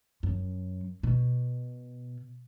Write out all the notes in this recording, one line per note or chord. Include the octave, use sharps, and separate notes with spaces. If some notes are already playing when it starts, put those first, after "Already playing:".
F#2
B2